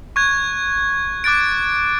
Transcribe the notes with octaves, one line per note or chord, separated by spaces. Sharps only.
C#6 F#6 G#6
D6 F#6 A6 D7